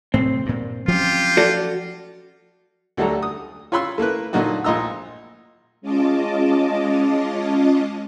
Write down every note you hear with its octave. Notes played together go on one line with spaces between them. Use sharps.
A2 C3 F#3 C4
G2 A#2
F3 F#3 C#4 F4 G4
F#4 A4 D5
D2 F#3 G3 D4 A4 A#5
D#6
F4 C#5 B5 C6 E6
A3 A#3 E4 B4
A#2 D3 F#3 D#4 F#4
A#1 F4 D#5 A#5 E6
G#3 C#4 F4 D#5 A5 D6